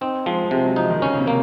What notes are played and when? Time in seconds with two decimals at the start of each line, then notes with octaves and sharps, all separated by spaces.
0.01 C4 D#4
0.26 F3 G#3
0.51 C3 G#3
0.64 F#3
0.76 F3 D#4
0.90 D#3
1.02 C#3 C#4
1.14 C#3
1.19 C3
1.27 A#3